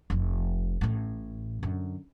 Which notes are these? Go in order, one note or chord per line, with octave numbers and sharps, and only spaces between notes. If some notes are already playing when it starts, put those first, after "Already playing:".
F1 F3
A1 A2
F#2 D3